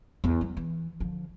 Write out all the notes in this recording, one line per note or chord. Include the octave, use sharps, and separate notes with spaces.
E2
F#3
E3
D3 F3